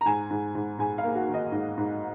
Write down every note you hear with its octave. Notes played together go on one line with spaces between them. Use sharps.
A#5
G#2 G#5
G#2
G#2
G#2 G#5
F5
A#3
F#4
D#3
D#5
G#2
G#2